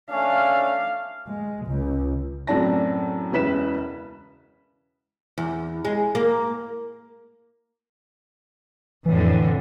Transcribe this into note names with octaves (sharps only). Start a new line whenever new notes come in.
A3 C#4 D4 F5
G#3
C#2
F#2 A2 C4 D4 A5 A#6
E1 C#3 E4 B4 B6 E7
E2
G#3
A#3
F2 A2 D3 E3